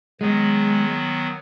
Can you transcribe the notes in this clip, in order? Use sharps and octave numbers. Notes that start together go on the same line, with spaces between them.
D#3 F#3 G#3 B3